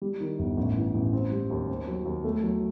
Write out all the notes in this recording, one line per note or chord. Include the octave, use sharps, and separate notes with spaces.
G3
D#3
G1
A1
E3
A1
C4
G3
D#2
C4
F#3
D#2
A3
F#3